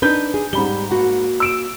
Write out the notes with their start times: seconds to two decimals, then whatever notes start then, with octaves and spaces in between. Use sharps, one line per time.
0.02 D4 D#4 B4 G6
0.34 G#4
0.53 G#2 G3 B5 G7
0.91 A#3 F#4 F#5
1.40 E6 D7 E7